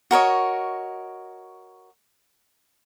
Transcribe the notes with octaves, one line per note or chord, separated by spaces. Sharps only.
F#4 A#4 C#5 D#5